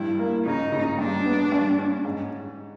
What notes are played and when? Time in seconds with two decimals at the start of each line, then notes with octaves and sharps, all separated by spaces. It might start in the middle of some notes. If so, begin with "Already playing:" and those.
Already playing: G2 E4
0.19 A#3
0.46 C#3 D#4
0.72 C#3
0.99 G2 D4
1.26 B3
1.52 G2
1.79 C#4
2.05 G#2